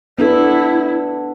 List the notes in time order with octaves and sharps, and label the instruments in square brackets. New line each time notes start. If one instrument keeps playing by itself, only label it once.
[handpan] B3 D4 A4 [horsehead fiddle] E4